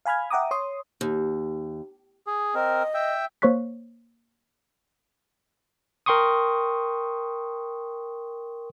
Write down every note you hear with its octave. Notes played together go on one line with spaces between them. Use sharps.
F5 G#5 B5 F6 G#6
E5 F#5 G5 A#5 D6 D#6
C#5 C6 D#6
D#2
G#4
C4 A#4 D#5
E5 G5
A#3 C5 C#5 C#6 F#6 B6
A#4 G5 C6 C#6 D#6